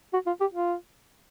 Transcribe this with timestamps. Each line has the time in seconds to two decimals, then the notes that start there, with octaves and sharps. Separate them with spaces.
0.13 F#4
0.27 F4
0.40 G4
0.54 F4